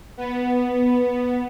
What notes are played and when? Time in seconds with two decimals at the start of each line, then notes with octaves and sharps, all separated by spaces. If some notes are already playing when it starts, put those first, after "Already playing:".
0.17 B3